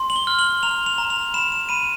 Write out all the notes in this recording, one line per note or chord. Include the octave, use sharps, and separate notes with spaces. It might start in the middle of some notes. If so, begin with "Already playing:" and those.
Already playing: C6
F#7
G7
F6
F#7
A#5 F7
F7
A#5
F7
B5 E7
E7
B5 D#7